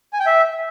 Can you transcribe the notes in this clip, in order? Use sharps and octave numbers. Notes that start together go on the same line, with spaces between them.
G#5
G5
E5